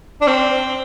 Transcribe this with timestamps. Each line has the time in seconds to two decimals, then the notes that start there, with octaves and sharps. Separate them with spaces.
0.21 D4
0.27 C4